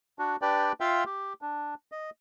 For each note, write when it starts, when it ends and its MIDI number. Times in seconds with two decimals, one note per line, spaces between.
0.19 0.36 62
0.19 0.36 66
0.42 0.72 62
0.42 0.72 67
0.42 0.72 71
0.42 0.72 74
0.42 0.72 79
0.80 1.04 65
0.80 1.04 76
0.80 1.04 77
0.80 1.04 79
0.80 1.04 84
1.06 1.33 67
1.42 1.74 62
1.92 2.10 75